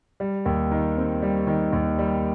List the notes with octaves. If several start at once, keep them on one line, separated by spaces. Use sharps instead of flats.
G3
D#2
D#3
C4
G3
D#3
D#2
G3